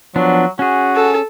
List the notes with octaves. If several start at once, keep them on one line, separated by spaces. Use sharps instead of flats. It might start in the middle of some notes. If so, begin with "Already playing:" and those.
F3 F#3 B3 D4
C#4 F#4 G#4
A4